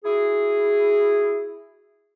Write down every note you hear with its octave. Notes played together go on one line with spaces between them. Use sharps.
E4 F#4 G#4